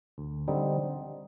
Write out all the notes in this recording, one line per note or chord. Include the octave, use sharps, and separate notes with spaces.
D2
D3 G3 C4 D#4